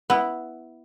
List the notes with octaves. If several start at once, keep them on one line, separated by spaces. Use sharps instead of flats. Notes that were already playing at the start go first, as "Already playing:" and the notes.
B3 E4